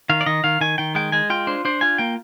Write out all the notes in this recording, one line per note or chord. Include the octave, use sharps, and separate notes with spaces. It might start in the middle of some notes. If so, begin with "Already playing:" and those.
D#3 F5
D5
D#3 D#5
D#3 F5
D#3 G#5
D#3 G5
G#3 G5
G#3 G#5
F4 G5
D4 C5
D4 C5
F4 G#5
A#3 G5